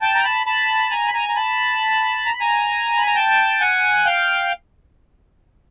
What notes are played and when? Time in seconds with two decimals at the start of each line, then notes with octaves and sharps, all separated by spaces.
0.02 G5 A5
0.15 A#5
0.24 A5 B5
0.46 A5 B5
0.91 G#5 A#5
1.08 B5
1.14 G#5 A#5
1.29 A#5
1.36 A5 B5
2.26 A#5
2.34 B5
2.40 G#5 A#5
2.98 B5
3.07 A#5
3.16 G5 A5
3.60 F#5 G#5
4.05 F5 G5